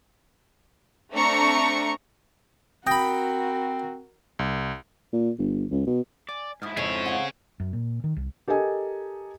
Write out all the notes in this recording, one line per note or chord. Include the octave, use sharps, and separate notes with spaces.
A3 C4 D4 A#5 C#6
C4 F#4 A#4 G5 B5 D#6 G6 A#6
C2
A#2
G1
C#2
B2
D5 G#5
G#2 E4 D#6 F6
F2 G#4 C#5
F5 F#5
F#2
A#2
D#3
C2
G4 A4 A#4 D#5 G#5